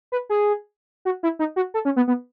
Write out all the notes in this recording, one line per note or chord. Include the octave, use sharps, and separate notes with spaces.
B4
G#4
F#4
E4
D#4
F#4
A4
C#4
B3
B3